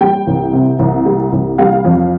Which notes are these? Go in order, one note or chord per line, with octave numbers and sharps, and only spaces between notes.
G3 G5
C2
C3
C2
G3
C2
G3 F5
F2